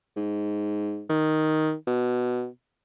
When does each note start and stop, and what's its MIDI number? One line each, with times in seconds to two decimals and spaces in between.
0.17 1.04 44
1.10 1.74 51
1.87 2.48 47